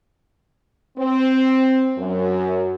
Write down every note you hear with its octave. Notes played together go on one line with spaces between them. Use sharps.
C4
F#2